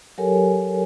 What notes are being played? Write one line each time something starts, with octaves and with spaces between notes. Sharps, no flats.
F#3 G4 A4 A#4 C#5 G#5